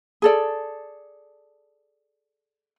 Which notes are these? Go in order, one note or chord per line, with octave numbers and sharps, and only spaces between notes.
G#4 A4 D5